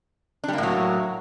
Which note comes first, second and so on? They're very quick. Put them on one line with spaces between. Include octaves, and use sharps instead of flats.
D4 G3 A#3 A2 F#3